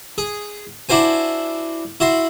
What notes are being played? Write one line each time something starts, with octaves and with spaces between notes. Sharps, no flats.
G#4
D4 E4 F#4 C5 G#5
E4 F#4 C6